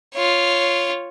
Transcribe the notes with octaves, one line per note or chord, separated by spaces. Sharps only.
F4 C#5